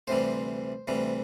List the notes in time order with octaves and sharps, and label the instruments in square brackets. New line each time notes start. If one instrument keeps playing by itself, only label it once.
[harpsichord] D2 C3 E3 G3 C5
D2 C3 E3 G3